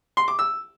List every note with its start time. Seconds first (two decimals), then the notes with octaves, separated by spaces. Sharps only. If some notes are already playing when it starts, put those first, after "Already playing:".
0.17 C6
0.28 D6
0.39 E6